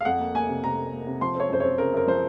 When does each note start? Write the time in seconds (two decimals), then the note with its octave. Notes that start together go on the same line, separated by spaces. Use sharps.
0.01 F5
0.05 F2 F#5
0.19 A#3
0.34 A#3 G#5
0.49 C3
0.64 C3 A#5
0.77 A#3
0.93 A#3
1.07 C3
1.21 F3 C6
1.35 C4 C#5
1.49 F#2 C5
1.60 C4 C#5
1.78 C#3 A#4
1.93 F#2 A#4
2.08 F3 C5